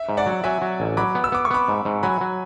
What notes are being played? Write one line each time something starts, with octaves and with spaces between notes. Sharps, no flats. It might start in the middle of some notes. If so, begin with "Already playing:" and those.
Already playing: E5
G#2
D5 F#5
F#3
F#3 E5 G#5
F#3
A1
F#3 B5 D6
B3
E6
B3 D6
C#6
B3 B5 D6
G#2
G#2
F#3 G#5 B5
F#3